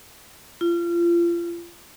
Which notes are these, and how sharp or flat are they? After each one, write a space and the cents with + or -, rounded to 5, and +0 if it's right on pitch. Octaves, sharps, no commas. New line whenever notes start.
F4 -30